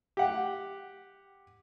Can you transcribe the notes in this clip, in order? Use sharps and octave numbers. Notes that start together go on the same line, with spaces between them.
G4 F#5